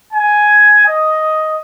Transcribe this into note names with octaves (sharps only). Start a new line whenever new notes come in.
G#5
D#5